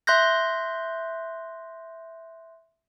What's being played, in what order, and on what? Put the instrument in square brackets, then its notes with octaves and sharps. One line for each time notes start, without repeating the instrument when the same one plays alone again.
[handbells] E5 C6 F#6 G6 A#6